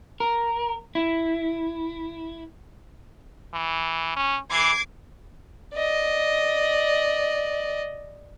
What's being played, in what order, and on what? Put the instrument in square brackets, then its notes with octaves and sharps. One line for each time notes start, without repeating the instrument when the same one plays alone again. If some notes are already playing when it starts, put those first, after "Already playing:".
[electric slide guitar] A#4
E4
[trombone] E3
C#4
[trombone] E3 [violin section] D6 G#6 C7
[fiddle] D5 D#5